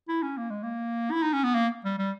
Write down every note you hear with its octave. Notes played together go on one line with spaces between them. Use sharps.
E4
C#4
A#3
G#3
A#3
E4
D#4
C#4
B3
A#3
G3
G3